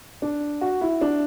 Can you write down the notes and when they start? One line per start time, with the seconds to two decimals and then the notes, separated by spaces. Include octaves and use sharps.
0.22 D4
0.61 F#4
0.81 E4
1.01 D4